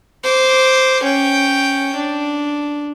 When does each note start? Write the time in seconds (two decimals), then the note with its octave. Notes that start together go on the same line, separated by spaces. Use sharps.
0.24 C5 D6
1.03 C#4 G5
1.95 D4